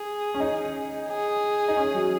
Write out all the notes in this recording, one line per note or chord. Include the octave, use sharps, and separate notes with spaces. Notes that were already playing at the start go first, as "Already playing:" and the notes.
Already playing: G#4
C#4
D#4
G#4
D#4
C#4
F#3